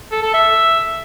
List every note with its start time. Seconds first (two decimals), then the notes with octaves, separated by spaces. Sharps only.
0.12 A4
0.23 A4
0.33 E5